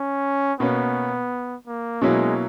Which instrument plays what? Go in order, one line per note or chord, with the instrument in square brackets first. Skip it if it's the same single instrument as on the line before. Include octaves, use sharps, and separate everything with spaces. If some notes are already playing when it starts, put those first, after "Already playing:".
Already playing: [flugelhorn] C#4
[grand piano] B2 A#3 C#4 [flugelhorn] B3
[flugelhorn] A#3
[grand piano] B2 F#3 A#3 C#4 E4 [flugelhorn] G#3